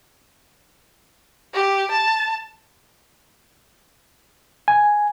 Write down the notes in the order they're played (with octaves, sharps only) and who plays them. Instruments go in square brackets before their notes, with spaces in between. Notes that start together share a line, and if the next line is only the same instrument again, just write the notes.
[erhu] G4
A5
[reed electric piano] G#5